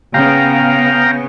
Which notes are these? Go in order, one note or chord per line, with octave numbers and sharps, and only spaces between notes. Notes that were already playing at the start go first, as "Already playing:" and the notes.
C#3 B3 F5 G5 A#5